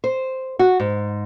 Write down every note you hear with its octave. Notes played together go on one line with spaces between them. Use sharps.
C5
F#4
G#2